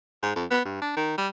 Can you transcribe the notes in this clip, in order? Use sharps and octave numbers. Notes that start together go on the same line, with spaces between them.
G#2
F2
B3
G2
D4
D#3
G3